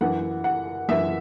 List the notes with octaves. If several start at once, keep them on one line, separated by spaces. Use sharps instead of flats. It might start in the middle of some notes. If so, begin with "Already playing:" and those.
F#2 E3 F#5
F#5
F#2 E3 E5